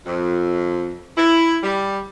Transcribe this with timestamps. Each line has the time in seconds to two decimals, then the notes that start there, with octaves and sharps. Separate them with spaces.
0.05 F2
1.17 E4
1.62 G3